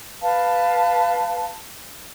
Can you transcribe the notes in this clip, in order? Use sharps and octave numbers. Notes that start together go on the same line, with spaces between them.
B4 F5 A5